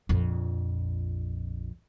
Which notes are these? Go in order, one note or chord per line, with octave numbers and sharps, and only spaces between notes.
A#1 F2